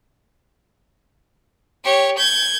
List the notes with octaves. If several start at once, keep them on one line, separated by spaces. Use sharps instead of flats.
G4 C#5
G6 G#6